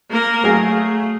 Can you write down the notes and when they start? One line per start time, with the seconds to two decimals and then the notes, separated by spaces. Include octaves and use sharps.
0.11 A#3 A#4
0.44 F#3 A3 G#4 F5